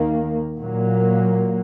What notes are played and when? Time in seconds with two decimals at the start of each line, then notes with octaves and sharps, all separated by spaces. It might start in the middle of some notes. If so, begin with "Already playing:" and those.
Already playing: D#2 D#3 A#3
0.58 A#2 F#3 A#3